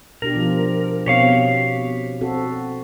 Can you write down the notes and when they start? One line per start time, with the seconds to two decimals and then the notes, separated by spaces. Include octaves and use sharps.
0.22 B2 D4 G4 A#4
0.36 F3 F4
1.06 B2 C4 G4 C#5 F5
2.21 C4 F#4 A4